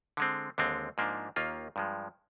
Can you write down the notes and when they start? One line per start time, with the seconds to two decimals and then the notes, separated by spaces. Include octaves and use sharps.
0.17 D3 G#3 C4
0.58 D#2 D3 G#3 C4
0.98 G#2 F3 A#3 D4
1.36 D#2 D#3 A#3 F4
1.76 G2 F3 G#3